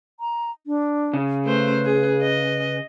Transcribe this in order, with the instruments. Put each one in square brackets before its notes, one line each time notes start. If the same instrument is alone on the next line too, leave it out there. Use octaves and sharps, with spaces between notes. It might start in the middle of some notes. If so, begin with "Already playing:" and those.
[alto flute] A#5
D4
[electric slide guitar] C#3
[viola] A3 C5 [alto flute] B4
[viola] G#4
D#5